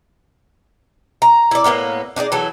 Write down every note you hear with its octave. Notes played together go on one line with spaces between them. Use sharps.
A#5
E4 D5
A2 A#3 B3 A#4
D4 D#4 G#4 D5
E3 F#3 G#4 A4